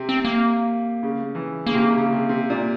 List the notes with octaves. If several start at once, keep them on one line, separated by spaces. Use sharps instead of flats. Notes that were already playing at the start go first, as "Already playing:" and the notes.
Already playing: C3
C4
A#3
C#3
E3
C#3 A#3
C3
C#3
C#3
C3
C3
A#2